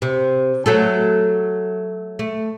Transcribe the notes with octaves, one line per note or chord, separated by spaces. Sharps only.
C3
F#3 A3 A4
A3